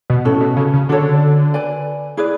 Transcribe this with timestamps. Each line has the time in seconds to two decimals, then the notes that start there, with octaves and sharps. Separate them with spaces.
0.10 B2
0.25 A2 C#4 F#4 A4
0.41 B2
0.56 C#3
0.73 C#3
0.89 D3 D4 F#4 A4 C#5
1.54 B4 D5 G#5
2.17 E4 G#4 B4 D5